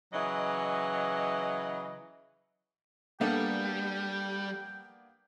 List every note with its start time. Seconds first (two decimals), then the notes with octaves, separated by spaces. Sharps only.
0.12 C#3 E3 F#3 D#5
3.21 G3 A#3 B3 D4 A4 G5